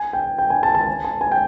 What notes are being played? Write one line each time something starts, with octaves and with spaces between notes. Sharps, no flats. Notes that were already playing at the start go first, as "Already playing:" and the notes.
Already playing: G#5
G5
G5
G#5
A5
A5
G#5
A5
G#5
G5